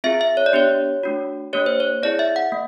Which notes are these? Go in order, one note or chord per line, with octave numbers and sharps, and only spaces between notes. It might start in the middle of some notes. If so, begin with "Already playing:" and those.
C4 F4 G#4 E5
E5
C#5
D5
B3 D4 G4 C#5
A3 D4 F#4
A#3 D4 G4 C#5
C5
C#5
C4 E4 G#4 D5
E5
F#5
A#3